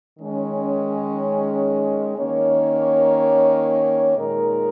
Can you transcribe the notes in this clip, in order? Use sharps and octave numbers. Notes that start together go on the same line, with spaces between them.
D#3 G#3 C#4
D#3 A#3 C#4 A#4 C#5
A#2 G#3 D#4 A#4